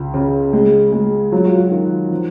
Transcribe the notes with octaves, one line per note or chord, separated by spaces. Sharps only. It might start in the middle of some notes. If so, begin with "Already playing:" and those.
Already playing: C#2
C#3
G#3
G#3
F#3 F4
F#4
F4
D#3 F4
F3